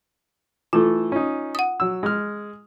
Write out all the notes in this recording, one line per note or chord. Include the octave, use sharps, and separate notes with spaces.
E3 A3 F4 A4
C#4 D#4
F#5 D#6
F#3 E6
G#3 F6